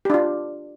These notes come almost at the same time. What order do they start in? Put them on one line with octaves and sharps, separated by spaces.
G4 D4 F4